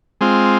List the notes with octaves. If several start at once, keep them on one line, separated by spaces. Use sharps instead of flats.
G#3 C4 F4